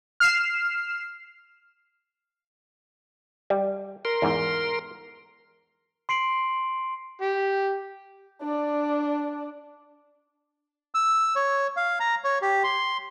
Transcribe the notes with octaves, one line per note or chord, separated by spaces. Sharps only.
F6 C7 E7
G3
A#4 C6
E2 G#2
C6 C7 D7 F#7
G4
D4 D5
E6
C#5
F5
A#5
C#5
G4
C6